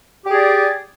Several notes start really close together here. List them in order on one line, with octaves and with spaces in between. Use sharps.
G4 G#4 D5